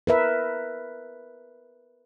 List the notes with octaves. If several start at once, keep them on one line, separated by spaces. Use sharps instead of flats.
A#4 B4 E5